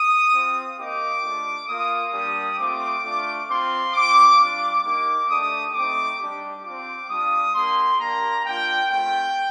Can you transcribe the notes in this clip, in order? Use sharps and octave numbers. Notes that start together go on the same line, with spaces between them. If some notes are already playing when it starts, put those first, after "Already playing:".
Already playing: D#6
C4 F4
A#3 D#4 G4 D6
A3 D4 F4
A#3 F4 D#6
G3 A#3 D4 G4 D#6
A3 C4 F4 D6
A3 D4 F4
C4 F4 C6
C4 F4 D6
G3 D4 F4 D6
A#3 D#4 G4 D6
A3 D4 G4 D#6
A3 C4 D#4 D6
G3 D4 G4
C4 F4 D6
G3 D4 F4 D#6
A#3 D4 G4 C6
A#3 D4 G4 A#5
A#3 D4 F4 G5
A3 C4 F4 G5